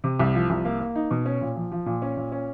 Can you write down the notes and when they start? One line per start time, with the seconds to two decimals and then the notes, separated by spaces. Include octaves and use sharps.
0.04 C3
0.19 C2
0.35 F3
0.50 C2
0.65 A#3
0.80 A#3
0.96 D#4
1.11 B2
1.25 C#4
1.41 A#2
1.56 F3
1.72 F3
1.86 A#2
2.02 C#4
2.17 A#2
2.32 C#4